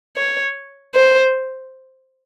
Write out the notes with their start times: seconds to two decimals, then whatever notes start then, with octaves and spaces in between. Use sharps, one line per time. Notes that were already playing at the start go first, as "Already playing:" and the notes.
0.17 C#5
0.95 C5